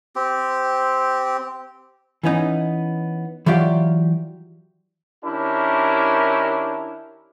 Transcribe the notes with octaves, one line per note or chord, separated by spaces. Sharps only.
C4 G4
E3 B3 C#4 D#4
E3 F#3 F4 G4 D5
D#3 C#4 D4 E4 G4 A#4